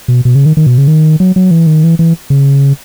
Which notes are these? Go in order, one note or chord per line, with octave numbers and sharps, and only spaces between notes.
B2
B2
C#3
D#3
D#3
B2
C#3
D#3
F#3
F#3
E3
D#3
E3
E3
C#3